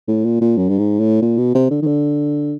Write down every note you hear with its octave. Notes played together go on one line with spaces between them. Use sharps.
A2
A#2
A#2
F#2
G2
G#2
A2
A#2
B2
C3
D3
D#3
D3